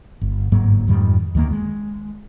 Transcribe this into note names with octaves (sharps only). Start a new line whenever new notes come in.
G1
G1 G#2 F#3 A#3
F2 G#2 D#3 G3
D2 D#3 F3 A#3
G#3